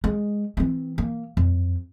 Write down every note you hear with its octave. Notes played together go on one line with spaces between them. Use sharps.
G#3
E3 C4
A#3
F2